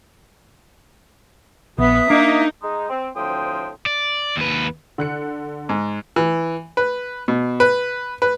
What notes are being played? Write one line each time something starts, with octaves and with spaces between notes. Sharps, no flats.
A#1 B3 E5 D#6
A#3 D4 D#4
G#3 D#4
C4
D2 A2 F3 C4 G5 D#6
D5
D#2 B4
D3 F#6 C#7
G#2
E3
B4
B2
B4
B4